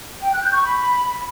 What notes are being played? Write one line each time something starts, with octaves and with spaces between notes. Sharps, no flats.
G5
F#6
G6
C#6
B5